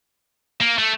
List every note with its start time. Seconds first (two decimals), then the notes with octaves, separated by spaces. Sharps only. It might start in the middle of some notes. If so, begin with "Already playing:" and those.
0.61 A#3
0.78 A3